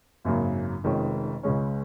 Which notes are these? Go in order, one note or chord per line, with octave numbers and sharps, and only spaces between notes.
G#1 F#2 C#3 F#3 A#3
F1 F2 D#3 G#3 C#4
C#2 C#3 G#3 C#4